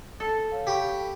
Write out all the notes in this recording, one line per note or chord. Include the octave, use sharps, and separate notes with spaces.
A4
C#5 F5
G4 B5 C#6 B6